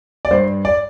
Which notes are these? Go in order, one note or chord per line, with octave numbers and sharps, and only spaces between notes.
D5
G2 C5
D5